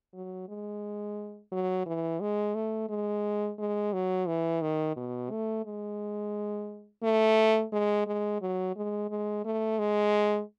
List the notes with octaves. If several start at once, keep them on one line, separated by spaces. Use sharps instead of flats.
F#3
G#3
F#3
E3
G#3
A3
G#3
G#3
F#3
E3
D#3
B2
A3
G#3
A3
G#3
G#3
F#3
G#3
G#3
A3
G#3